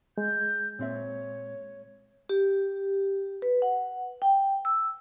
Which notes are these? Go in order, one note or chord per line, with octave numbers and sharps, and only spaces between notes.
G#3 G6
A#2 C4 C#5 E5
G4
B4
F#5
G5
E6